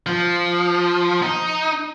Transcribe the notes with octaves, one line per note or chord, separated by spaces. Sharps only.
F3
D#4